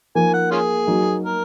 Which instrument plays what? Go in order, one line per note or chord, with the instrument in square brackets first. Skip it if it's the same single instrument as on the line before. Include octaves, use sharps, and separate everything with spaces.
[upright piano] F3 A#3 D#4 [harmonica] G#5
[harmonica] F#5
C#4 F4 G#4
[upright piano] F#3 A#3 D#4 F#4
[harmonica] A#4